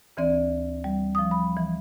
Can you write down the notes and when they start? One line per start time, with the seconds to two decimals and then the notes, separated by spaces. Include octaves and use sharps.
0.17 D2 E3 C4 D5
0.84 G3
1.15 F3 D#6
1.31 B5
1.57 E3